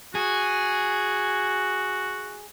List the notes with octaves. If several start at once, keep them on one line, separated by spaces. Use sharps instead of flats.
F#4 G#4